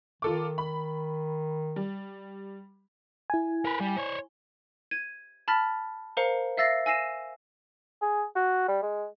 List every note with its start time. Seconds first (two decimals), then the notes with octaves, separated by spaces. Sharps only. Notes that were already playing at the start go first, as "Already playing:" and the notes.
0.22 D#3 F4 A4 D6
0.58 B5
1.76 G3
3.30 E4 G#5
3.65 A#4 B4
3.81 G3
3.97 C5 C#5
4.91 G#6 D#7
5.48 A5 B5 F6 A6 B6
6.17 A#4 C5 F5 A#5 C#7
6.57 E5 F5 E6 A6 A#6 C7
6.86 G#5 E6 A#6 C7 D#7 E7
8.02 G#4
8.36 F#4
8.68 G3
8.82 G#3